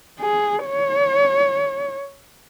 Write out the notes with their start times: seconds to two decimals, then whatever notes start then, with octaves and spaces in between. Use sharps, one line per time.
0.20 G#4
0.66 C#5